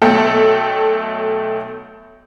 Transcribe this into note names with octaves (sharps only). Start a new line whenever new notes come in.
B1 A3 A4 G5